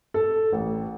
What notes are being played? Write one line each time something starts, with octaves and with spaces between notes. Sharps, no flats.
A4
A1